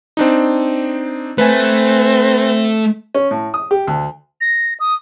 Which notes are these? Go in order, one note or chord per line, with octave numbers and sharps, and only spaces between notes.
C4 D4 D#4
A3 C4 B4 G#5
C#4
A2
D#6
G4
D2
A#6
D#6